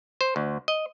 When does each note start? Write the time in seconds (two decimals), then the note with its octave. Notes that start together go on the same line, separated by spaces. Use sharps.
0.21 C5
0.36 D2
0.68 D#5